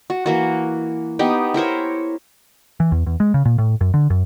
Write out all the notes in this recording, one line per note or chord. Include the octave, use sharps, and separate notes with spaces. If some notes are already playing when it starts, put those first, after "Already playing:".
F#4
E3 A#3 F#4
B3 D#4 G4
E4 A#4 C5 C#5
E3
E2
E2
G#3
C#3
A#2
A2
F#2
D3
F#2